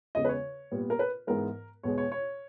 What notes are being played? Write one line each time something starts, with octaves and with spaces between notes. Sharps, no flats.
E2 C#3 G#3 B3 D#5
B4
C#5
A#2 G3 B3
A#4
B4
G#2 E3 G#3 B3 A#4
E2 B2 G#3 C#5
C#5
C#5